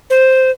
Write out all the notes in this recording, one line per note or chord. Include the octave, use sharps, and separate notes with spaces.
C5